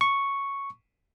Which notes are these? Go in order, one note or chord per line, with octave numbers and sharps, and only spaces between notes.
C#6